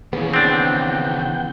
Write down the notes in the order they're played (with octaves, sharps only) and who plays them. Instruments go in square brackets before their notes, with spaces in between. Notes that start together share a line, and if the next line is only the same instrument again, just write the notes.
[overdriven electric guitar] D#2 C#3 [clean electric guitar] E3 B3 [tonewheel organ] G#4
[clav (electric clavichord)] C4 D4 [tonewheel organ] F#5 G5 G6